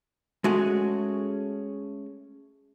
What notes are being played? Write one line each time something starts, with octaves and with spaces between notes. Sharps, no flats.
G#3 A3 C#4 F#4 G#4